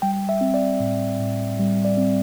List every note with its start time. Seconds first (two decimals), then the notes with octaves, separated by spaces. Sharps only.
0.02 G3 G5
0.29 E5
0.41 C4
0.54 D5
0.80 A2
1.20 A2
1.59 G3
1.85 D5
1.97 C4